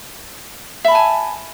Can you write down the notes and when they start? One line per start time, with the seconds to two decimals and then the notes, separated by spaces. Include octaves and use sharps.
0.85 E5
0.88 B5
0.91 A5
0.95 G#5